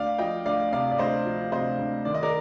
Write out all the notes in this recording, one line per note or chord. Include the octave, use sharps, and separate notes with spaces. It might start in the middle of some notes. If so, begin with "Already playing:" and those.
Already playing: D2 D5 F5
F3 D#5 G5
D2 D5 F5
C3 D5 F5
D5
D2 C5 D#5
F3
C3 C5 D#5
D2
D#3 D5
D#5
A#4 D5